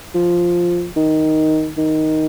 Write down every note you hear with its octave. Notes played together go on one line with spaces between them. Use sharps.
F3
D#3
D#3